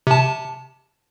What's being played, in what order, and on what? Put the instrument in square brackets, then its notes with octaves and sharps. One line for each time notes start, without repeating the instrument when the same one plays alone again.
[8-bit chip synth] C3 A5